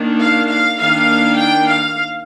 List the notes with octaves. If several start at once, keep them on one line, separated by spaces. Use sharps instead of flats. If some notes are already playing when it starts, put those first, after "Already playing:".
Already playing: D#3 A#3 D4
F5
F5
D#3 A#3 D4 F5
G5
F5